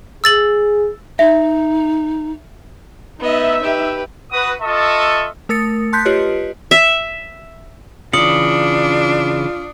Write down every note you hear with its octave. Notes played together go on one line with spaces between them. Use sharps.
G#4 E6 A6 F#7
D#4 E5
B3 D#4 D#5 E5
G4 B4
F#4 B4 D#6
F4 A4 D#5 E5 A5 C#6
A3 A#4 D#6 A6 C#7
A5 C6 F#6 G6 B6
F4 G4 B4 C#5 D#5
E5
C#3 E3 D4 F4 D#6 C#7 F#7